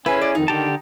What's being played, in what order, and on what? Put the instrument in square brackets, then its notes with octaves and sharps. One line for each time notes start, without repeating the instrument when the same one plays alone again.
[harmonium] C#4 [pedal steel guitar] E4 G#4 [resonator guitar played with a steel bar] B4
[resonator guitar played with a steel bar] D5
[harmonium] F2 D#3 [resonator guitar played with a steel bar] D#4
[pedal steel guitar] D3 G4 A5 [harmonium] D#3